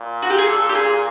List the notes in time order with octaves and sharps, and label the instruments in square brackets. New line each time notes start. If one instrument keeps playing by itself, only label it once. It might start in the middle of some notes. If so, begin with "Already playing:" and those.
Already playing: [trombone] A#2
[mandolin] F#4
G4
G#4
A4
G4
G#4